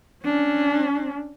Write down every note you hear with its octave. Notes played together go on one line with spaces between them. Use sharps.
C#4 D4